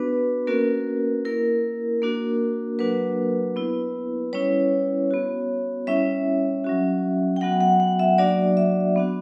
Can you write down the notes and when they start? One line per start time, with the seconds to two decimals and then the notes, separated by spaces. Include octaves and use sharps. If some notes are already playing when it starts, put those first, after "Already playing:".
Already playing: B3 D4 F#4 B4
0.47 A#3 C#4 F#4 A#4
1.25 A#3 E4 A#4
2.02 A#3 D4 F#4
2.79 F#3 A#3 D4 F#4 B4
3.56 B3 E4
4.33 G3 C#4 E4 C#5
5.11 B3 F#4
5.87 G3 C#4 E4 E5
6.64 F#3 C#4 F#4
7.36 G5
7.41 F#3 B3 F#4 F#5
7.61 F#5
7.80 F#5
7.99 E5
8.18 F#3 A#3 D4 F#4 D5
8.57 E5
8.96 B3 D4 F#4